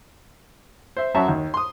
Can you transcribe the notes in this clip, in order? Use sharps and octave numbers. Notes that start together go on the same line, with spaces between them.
C5 E5
F#2 F#4 E5 A5 A#5
D#2
C6 D#6